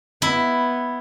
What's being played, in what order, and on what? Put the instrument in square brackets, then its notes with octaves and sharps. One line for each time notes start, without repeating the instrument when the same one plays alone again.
[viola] B3 [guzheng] E4